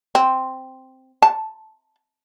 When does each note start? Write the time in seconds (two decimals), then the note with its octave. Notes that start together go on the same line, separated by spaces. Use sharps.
0.15 C4
1.22 A5